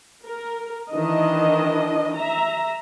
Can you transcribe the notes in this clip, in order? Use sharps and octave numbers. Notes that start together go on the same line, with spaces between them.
A#4
D#3 E3 D4 D#5
E5 A#5